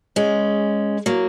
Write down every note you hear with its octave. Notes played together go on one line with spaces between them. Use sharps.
G#3 C#4
F#3 A#3